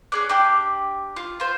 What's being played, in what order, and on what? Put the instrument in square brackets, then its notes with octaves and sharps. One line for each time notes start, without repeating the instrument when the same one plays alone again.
[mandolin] C#4 G#4 D5 [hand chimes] F#6
[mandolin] D4 G4 [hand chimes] D6
[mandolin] F4
F4 C5